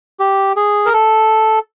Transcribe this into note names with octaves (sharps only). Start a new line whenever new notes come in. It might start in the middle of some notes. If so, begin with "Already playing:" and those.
G4
G#4
A#4
A4